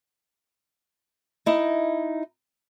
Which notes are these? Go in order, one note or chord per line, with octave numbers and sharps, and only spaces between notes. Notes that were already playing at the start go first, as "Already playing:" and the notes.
D#4 E4 D#5